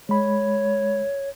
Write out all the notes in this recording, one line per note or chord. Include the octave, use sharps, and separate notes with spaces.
G#3 C#5 B5